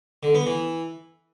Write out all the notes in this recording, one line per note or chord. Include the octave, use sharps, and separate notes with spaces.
D3
B3
E3